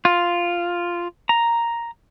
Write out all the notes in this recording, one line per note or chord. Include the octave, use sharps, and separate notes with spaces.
F4
A#5